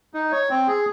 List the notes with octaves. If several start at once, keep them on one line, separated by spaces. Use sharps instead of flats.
D#4
C#5
C4
G#4